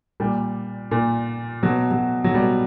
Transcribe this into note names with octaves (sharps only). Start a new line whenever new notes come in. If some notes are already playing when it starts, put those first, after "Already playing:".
A#2 G3
A#2
B2 F#3
F#3
F#3
B2 G3